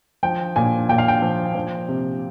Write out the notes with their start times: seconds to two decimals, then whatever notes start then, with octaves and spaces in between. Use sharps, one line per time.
0.23 F3 G5
0.56 A#2 G#5
0.89 A#2 G5
0.98 F5
1.08 G5
1.22 F3
1.55 F3
1.89 C3